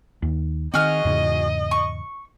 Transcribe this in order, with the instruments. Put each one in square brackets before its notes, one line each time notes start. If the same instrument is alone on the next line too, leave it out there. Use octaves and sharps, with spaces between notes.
[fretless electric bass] D#2
[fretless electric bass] D#3 C4 [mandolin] F#4 G#4 F6 [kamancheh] D#5
[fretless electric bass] E2 G#2 C#3
[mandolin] C#6